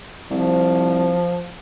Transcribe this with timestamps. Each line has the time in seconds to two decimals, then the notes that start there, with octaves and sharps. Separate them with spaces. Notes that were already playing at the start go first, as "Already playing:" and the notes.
0.31 C2 F3